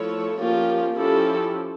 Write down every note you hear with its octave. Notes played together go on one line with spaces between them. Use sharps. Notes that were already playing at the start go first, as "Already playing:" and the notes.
Already playing: F3 A3 E4 A4 C#5
F3 A#3 C#4 F4 G4
F3 C#4 E4 G4 A4